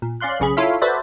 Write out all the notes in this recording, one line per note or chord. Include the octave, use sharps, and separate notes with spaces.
A#2
C#4 D5 F5 C6 F#6
B1 C#3 C#4 G#4 B5
E4 F4 A4 C#5 E5 F5
F#4 A4 B4 C5 D5 E5